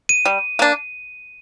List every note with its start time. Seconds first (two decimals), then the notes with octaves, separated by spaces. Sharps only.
0.09 D#7
0.26 G3
0.59 A#3 D4